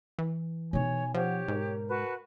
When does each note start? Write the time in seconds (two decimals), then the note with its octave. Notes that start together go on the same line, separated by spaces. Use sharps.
0.18 E3
0.73 B2 D#4 C#5 G#5
1.14 F3 G4 C#5 F#5
1.48 G#2 A#4
1.88 F#4 B4 A5